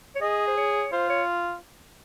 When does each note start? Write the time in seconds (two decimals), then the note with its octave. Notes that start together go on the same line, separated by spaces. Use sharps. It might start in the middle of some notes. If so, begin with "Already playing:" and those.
0.15 C#5
0.21 G#4 D#5
0.47 C5
0.57 C#5
0.92 F4 C5
1.09 C#5